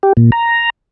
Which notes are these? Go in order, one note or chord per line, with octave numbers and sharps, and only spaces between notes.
G4
A#2
A#5